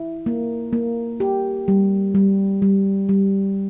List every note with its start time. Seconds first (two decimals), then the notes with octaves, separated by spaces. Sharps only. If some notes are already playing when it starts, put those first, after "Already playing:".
Already playing: E4
0.26 A#3
0.73 A#3
1.20 G4
1.68 G3
2.15 G3
2.62 G3
3.09 G3